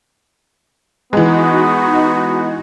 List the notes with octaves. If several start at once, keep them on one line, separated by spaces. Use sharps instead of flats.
E3 G#3 B3 D#4 F#4